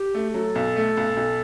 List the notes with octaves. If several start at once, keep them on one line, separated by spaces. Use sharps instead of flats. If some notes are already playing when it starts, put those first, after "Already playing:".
Already playing: G4
A3
G4
F#3 A4
B1
A3
B1
B1